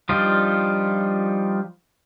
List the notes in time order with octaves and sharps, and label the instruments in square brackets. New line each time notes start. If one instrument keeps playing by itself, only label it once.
[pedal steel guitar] F3 G3 D4 D#4 F4